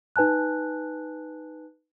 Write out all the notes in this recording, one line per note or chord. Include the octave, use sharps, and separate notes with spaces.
D#4 B4 G#5 A5 F#6